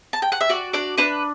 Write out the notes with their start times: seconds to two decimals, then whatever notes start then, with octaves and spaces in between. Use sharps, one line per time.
0.13 A5
0.22 G5
0.32 F#5
0.41 E5
0.49 F#4 D5
0.73 D4 D5
0.98 D4 B4